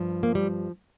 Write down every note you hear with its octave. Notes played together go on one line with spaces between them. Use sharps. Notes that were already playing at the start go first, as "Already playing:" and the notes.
Already playing: G2 F3
A#3
G3